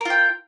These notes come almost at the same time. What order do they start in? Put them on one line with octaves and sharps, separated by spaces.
A#4 F4 G5